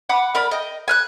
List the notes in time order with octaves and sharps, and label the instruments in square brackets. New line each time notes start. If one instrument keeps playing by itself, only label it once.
[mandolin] F#5 B5 D6
A#4 D5 B5
D#5 G5
G#5 F6 F#6